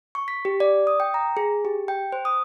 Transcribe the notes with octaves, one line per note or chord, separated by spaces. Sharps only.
C#6
B6
G4
D5
D#6
G5
A#5
G#4
G4
G5
C5
D#6